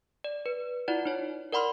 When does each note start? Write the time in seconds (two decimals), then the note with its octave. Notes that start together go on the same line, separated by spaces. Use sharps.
0.24 D5
0.46 B4
0.88 E4 F4 D5 F#5
1.05 D#4 C#5
1.52 A#4 D5 F#5 B5 C6 F6